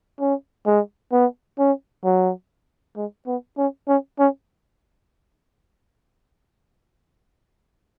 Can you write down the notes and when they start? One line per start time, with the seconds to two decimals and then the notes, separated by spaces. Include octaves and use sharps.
0.20 C#4
0.66 G#3
1.12 B3
1.58 C#4
2.04 F#3
2.96 G#3
3.27 B3
3.58 C#4
3.88 C#4
4.19 C#4